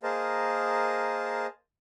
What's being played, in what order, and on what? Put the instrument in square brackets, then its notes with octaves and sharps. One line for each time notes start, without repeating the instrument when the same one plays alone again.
[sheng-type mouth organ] A#3 G#4 A#4 C5 D#5 A5